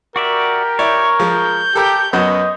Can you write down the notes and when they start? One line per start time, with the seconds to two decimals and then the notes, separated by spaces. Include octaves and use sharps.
0.16 F#4 G4 A#4 D5 E5
0.79 E4 C#5 D5
1.20 F3 G#3 G6
1.75 G4 A4 A#4
2.13 F#2 B3 F#4 D#5